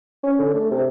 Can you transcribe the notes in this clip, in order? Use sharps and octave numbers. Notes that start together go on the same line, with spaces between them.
C#4
D3
A3
C3